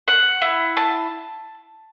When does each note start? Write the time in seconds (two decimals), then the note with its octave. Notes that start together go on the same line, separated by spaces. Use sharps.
0.08 F#5
0.42 E4
0.77 A5